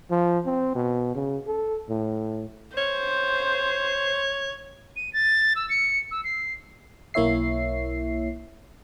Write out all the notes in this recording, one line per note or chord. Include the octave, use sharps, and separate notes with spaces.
F3
C4
B2
C#3
A4
A2
C5 C#5
D#7
A6
E6
C#7
E6
C7
B1 A#3 E4 C#5 E5 C7